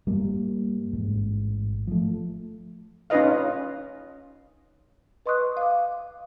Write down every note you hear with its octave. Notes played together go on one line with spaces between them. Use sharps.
G2 G3 A#3
A1 G#2
F3 A3
C#4 D#4 F4 B4 D#5 F5
B4 D#5 C6 C#6 D#6 F#6
F5 D6